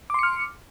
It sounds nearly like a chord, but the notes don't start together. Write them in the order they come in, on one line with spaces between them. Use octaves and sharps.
D6 C6 C#7 F6